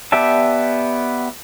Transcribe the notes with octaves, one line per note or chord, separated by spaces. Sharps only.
B3 G4 D5 E5 A5